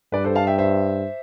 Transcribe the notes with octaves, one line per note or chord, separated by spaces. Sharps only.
G2 B4 D5
A4 C5
F5 A5
E5 G5
C5 E5